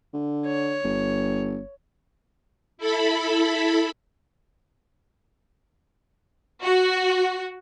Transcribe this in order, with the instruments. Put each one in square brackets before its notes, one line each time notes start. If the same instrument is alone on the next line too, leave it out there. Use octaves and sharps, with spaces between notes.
[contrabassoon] D3
[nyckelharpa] C#5
[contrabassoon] G1
[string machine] E4 A4 B5
[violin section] F#4